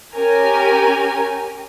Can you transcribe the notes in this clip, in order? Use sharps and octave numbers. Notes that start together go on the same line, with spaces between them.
C#4 G4 A#4 G#5